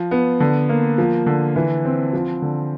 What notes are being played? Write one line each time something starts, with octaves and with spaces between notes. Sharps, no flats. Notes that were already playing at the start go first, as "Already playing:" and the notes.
Already playing: F3
B3
D3
A#3
F3
D3
E3
C4
F3
D3